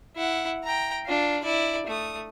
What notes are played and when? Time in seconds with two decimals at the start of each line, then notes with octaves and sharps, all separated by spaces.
0.16 E4 F#5
0.64 G5 A#5
1.06 D4 F4
1.43 E4 D5
1.87 A3 D#6